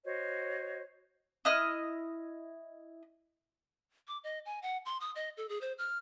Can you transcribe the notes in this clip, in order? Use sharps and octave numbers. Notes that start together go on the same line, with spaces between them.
F#4 C5 C#5 D#5
E4 D#5 F6
D6
D#5
G#5
F#5
C6
D#6
D#5
A4
G#4
C5
F6